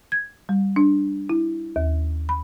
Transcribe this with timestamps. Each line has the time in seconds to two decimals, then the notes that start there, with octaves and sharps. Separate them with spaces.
0.12 G#6
0.49 G3
0.76 D4
1.29 E4
1.76 D#2
2.29 B5